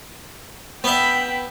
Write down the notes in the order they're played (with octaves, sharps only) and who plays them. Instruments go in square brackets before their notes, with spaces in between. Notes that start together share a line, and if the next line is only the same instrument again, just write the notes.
[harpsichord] B3 E5 [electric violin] G5 B5